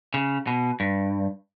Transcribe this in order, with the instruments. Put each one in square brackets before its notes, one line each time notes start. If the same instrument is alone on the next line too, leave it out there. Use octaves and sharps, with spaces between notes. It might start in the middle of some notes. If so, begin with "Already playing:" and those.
[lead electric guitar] C#3
B2
G2